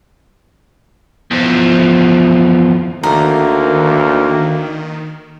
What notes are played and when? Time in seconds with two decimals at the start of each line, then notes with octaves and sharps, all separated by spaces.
1.31 E2 F3
3.03 D2 D#3 A#3 A#4